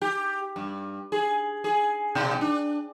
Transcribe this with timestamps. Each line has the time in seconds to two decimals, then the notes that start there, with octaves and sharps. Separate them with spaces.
0.02 G4
0.56 G2
1.12 G#4
1.64 G#4
2.15 B2
2.41 D4